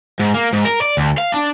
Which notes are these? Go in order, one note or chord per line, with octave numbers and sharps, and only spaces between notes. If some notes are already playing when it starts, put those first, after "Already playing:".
G#2
A#3
G#2
A#4
D5
D2
F5
D4